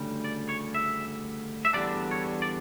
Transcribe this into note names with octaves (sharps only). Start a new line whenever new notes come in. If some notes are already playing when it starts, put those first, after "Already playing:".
Already playing: D2 C#3 G3
D5
C#5
E5
E5
E2 D3 G3 A#3 D4 D5
C#5
D5